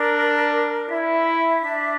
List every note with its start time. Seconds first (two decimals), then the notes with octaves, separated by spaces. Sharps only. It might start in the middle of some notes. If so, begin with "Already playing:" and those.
Already playing: D4 A#4
0.89 E4 E5
1.64 D4